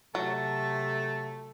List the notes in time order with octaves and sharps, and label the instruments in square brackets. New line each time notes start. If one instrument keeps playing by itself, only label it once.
[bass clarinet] C3 [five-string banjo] F#3 [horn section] A3 [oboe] A5